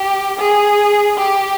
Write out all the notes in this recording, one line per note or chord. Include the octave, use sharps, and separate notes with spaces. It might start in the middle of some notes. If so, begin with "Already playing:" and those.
Already playing: G4
G#4
G4